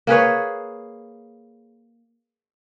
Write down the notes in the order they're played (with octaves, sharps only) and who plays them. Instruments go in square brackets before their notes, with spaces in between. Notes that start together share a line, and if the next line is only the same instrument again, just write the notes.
[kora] A#3 G#4 B4 C#5